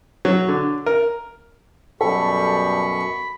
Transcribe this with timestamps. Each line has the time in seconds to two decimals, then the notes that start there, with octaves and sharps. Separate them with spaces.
0.25 F#3
0.48 D3
0.86 A#4
2.01 F#2 B2 G3 A4 B5 C#6